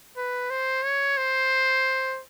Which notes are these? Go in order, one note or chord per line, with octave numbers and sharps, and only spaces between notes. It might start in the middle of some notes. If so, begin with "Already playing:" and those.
B4
C5
C#5
C5